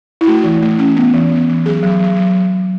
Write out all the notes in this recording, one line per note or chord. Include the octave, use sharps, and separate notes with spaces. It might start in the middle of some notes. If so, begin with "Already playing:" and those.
E4
A3 F#4
E3
A3
C#4
B3
E3
B3
E3
F#3 G#4
F#3
F#3
F#3